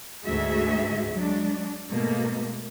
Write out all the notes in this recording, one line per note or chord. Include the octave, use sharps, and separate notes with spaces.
D2 G#2 F#4 G#4 E5
F#3 G#3 D4
G#2 B2 A3 A#3